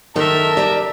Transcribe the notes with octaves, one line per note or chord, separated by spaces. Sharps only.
F#1 D#3 A4 A#4 E5 A5
G4 D5 A#5